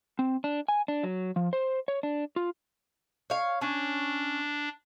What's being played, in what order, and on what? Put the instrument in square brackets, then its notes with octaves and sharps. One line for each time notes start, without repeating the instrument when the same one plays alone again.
[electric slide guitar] C4
D4
G#5
D4
F#3
F3
C5
C#5
D4
F4
[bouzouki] C#5 F5
[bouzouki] C#4 [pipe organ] D4